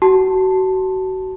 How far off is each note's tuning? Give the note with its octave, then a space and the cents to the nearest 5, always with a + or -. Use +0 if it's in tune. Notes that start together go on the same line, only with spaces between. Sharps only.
F#4 +30 A5 +0